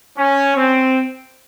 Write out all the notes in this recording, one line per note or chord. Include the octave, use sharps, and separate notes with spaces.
C#4
C4